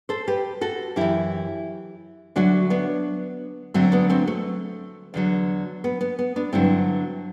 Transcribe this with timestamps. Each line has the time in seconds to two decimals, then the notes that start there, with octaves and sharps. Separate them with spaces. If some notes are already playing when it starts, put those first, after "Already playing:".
0.09 A4 C5
0.28 G4 B4
0.61 F#4 A4
0.96 F#2 E3 E4 G4
2.36 D2 D3 F#3 D4 F#4
2.70 B3 D4
3.74 D2 D3 F#3 A3 C4
3.92 B3 D4
4.10 A3 C4
4.27 A3
5.14 E2 D3 F#3
5.84 B3
6.01 B3
6.19 B3
6.36 B3 D4
6.52 G2 D3 F#3 C4 E4